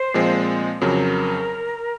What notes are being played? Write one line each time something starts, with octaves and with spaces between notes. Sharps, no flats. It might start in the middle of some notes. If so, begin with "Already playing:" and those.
Already playing: C5
A#2 F3 G#3 C4
F2 C#3 F#3 A#4